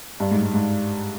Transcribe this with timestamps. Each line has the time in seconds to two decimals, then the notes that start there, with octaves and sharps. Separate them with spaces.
0.20 G2
0.31 G#2
0.42 G#2
0.54 G#2